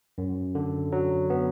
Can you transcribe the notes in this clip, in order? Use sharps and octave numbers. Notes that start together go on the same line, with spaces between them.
F#2
D3
F#3
B3